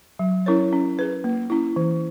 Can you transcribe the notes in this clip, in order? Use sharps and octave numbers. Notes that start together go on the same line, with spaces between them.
F#3
C#4 E4 A#4 C#5
C#4
G#4 B4
A#3
C#4 E4
E3